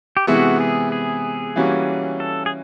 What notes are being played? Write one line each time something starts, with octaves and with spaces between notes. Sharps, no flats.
G4
C3 E3 G#3 B3 E4 F#4
G#4
G#4
E3 G3 A#3 C#4 F#4
A4
G#4